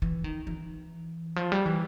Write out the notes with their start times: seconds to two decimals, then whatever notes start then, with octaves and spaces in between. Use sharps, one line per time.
0.02 E3
0.24 D#3
0.47 E3
1.36 F3
1.52 G3
1.66 E3